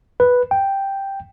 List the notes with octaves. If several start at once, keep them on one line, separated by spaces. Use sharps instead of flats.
B4
G5